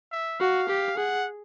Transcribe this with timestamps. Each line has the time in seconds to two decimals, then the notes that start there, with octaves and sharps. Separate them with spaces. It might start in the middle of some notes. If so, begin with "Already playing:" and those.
0.12 E5
0.40 F#4 F5
0.69 G4
0.97 G#4 F#5